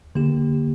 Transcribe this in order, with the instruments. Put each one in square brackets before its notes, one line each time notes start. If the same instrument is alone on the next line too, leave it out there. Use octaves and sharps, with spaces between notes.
[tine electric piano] D3 A#3 G4